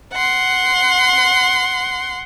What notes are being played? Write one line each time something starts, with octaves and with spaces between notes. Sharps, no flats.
F#5 C6